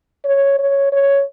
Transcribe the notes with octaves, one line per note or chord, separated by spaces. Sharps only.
C#5
C#5
C#5